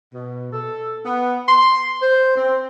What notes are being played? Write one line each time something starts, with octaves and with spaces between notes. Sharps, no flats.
B2
A4
B3
C6
C5
C4